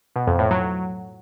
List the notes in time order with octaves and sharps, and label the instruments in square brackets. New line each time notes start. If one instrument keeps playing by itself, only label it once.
[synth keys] B2
F2
A2
F#3